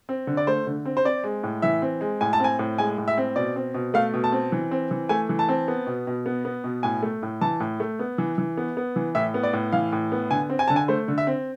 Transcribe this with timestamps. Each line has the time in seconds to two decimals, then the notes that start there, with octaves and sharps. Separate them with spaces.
0.09 C4
0.27 D3
0.37 D5
0.47 A3 C5
0.67 D3
0.85 C4
0.97 C5
1.05 C4 D5
1.24 G#3
1.43 A2
1.62 E3 E5
1.82 C4
2.01 G#3
2.21 A2 G#5
2.33 A5
2.40 C4 G#5
2.59 A2
2.78 G#3 G#5
2.98 A2
3.08 E5
3.18 C4
3.36 B2 D5
3.56 C4
3.74 B2
3.94 A3 F5
4.14 B2
4.24 A5
4.32 C4
4.52 E3
4.71 C4
4.91 E3
5.09 A3 G#5
5.29 E3
5.39 A5
5.49 C4
5.68 B3
5.87 B2
6.07 B2
6.26 B3
6.45 B3
6.64 B2
6.83 A2 G#5
7.03 A3
7.23 A2
7.41 E3 A5
7.60 A2
7.80 A3
7.99 B3
8.18 E3
8.38 E3
8.57 B3
8.77 B3
8.96 E3
9.15 A2 E5
9.34 B3
9.43 D5
9.53 A2
9.72 E3 F5
9.92 A2
10.12 B3
10.30 D3 G#5
10.50 C4
10.59 G#5
10.68 D3 A5
10.76 G#5
10.88 A3 C5
11.08 D3
11.18 E5
11.27 C4